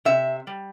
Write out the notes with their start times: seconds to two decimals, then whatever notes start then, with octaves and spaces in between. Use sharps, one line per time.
0.05 C3 E5
0.47 G3